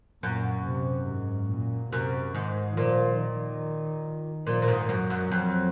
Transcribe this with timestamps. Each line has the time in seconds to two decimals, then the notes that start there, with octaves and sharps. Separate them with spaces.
0.23 F#2 A#2
0.66 C3
1.08 G#2
1.51 A#2
1.92 F#2 C3
2.35 G#2 D#3
2.77 A#2 F3
3.19 D#3
4.47 A#2 F3
4.62 A#2
4.68 G#2
4.89 F#2 F#3
5.10 F#2
5.31 F2